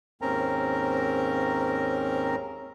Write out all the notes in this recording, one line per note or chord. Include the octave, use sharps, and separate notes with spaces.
D#2 G#2 C4 C#4 A#4 A#5